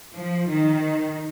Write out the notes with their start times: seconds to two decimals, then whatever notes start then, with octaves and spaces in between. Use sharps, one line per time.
0.15 F3
0.50 D#3